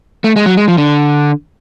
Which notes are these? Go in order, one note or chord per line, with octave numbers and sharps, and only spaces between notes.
A3
G#3
F#3
G#3
F3
D3